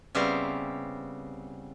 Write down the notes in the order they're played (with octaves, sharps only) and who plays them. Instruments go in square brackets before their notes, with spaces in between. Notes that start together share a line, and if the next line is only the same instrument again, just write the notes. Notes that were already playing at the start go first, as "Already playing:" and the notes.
[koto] C#3 G3 B3 C4 E4 F5